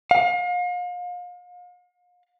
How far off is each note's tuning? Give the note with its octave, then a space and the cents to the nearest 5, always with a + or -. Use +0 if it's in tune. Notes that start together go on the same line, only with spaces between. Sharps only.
F5 +40